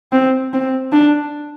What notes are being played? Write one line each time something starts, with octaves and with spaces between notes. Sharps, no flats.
C4
C4
D4